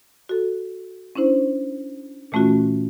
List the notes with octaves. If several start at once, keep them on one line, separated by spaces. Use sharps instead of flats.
F#4 A4
C#4 D4 E4 C5
A#2 E3 A3 C#4 F4 F#4